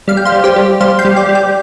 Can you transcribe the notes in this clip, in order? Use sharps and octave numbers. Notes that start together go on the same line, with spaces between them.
G3 F5
G5
C5 F5
G3
G4 C5
G3
G3 C5 F5
G5 C6
G3
D5 G5
G3
D5 G5